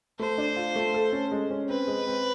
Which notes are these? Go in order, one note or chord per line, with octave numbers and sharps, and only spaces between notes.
A3 C5
D4
F4
A3
A4
C#4
G#3
C#4
C4 B4
G#3
C4